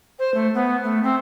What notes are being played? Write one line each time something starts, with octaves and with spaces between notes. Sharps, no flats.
C5
A3
B3
A3
C4